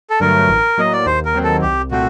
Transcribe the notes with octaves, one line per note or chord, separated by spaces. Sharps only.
A4
G2 D3 F#3 A3 A#4
A1
A2 F#3 A#3 D#5
D5
D#2 C5
A#4
D#3 F#3 C4
A4
C2 G4
A#2 A3 C4 F#4